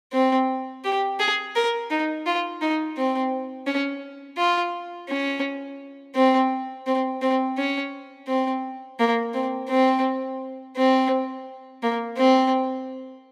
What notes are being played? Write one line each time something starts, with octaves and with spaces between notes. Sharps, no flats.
C4
G4
G#4
A#4
D#4
F4
D#4
C4
C#4
F4
C#4
C4
C4
C4
C#4
C4
A#3
C4
C4
C4
A#3
C4